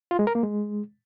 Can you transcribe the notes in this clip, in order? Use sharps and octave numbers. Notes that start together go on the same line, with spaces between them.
F4
G#3
A#4
A#3
G#3